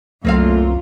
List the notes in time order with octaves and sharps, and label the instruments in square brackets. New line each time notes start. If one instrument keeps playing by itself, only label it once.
[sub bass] C2 [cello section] F#2 F4 [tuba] A3 [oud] A#3 C4 F5